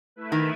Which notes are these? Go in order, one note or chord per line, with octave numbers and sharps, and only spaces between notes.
A3 E4 B4 E5
D#3